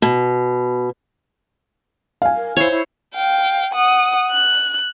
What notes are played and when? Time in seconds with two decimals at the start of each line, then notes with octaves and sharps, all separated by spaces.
0.02 B2
2.22 F5 G#5
2.36 A#4
2.57 E4 C5 C#5
2.71 E4
3.15 F5 G5
3.74 F#5 D#6
4.31 F#6